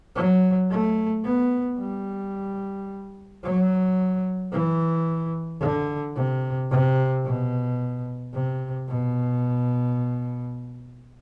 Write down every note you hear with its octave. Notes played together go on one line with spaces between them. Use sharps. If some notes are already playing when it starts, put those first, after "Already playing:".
F#3
A3
B3
G3
F#3
E3
D3
C3
C3
B2
C3
B2